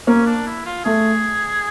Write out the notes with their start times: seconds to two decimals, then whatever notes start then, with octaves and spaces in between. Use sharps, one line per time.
0.07 A#3 C#4
0.26 D4
0.47 E4
0.66 F4
0.85 A3 G#4